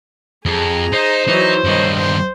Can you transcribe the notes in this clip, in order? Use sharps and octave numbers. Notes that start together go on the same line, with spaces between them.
F2 G#4 A#5
D#4 C5
E3 F#3 D#4
G2 D#3 C#5 D#5
C5